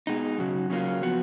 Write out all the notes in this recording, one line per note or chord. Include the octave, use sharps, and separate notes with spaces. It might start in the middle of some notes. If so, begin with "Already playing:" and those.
B2 G#3 D#4
F#2 C#3 F#3
C#3 F#3 A#3 C#4 F4
F3 B3 F#4